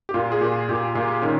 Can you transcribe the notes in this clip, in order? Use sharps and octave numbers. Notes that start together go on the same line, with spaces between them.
G4
A#2 F4
G#4
A#2 G4
A#2 G4
A#2 F4
D#3 C#4